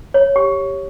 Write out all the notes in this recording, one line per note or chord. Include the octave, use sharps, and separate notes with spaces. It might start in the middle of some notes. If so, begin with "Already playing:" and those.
C#5
G4